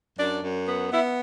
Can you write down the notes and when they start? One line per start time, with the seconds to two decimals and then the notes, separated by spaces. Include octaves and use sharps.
0.18 F#2 D4
0.43 F#2
0.68 B3
0.92 B3 E4